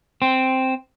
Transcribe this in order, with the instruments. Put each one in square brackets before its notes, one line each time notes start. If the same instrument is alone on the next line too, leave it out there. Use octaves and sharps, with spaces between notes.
[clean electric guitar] C4